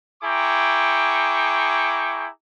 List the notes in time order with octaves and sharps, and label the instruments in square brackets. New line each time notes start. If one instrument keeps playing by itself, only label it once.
[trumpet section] E4 G#4 G5 A#5 C#6 D6